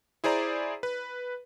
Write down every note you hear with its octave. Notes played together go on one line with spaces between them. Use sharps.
E4 G#4 C5 D5 A#5
B4